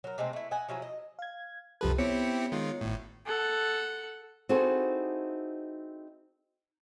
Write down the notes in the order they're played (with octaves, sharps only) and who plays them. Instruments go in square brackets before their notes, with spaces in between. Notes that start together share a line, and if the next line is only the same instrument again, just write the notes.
[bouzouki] F#3 A#4
C3 G#3 A3 C4
A3 E4
D#5 E5 F#5 G#5
F3 F#3 E4 G#4
D#5
[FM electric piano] F5 G#6
[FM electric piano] C2 G4 A4 [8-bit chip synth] F#2 F3 B4
[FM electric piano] B3 C#5 C#7 [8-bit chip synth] C4 E4 G4
[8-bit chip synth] D#3 G#3 F4
G#1 A2
[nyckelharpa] A4 F#5
[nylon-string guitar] C4 D#4 E4 F#4 G#4 A4